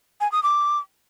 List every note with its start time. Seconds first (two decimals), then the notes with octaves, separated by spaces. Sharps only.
0.21 G#5
0.32 D#6
0.43 D6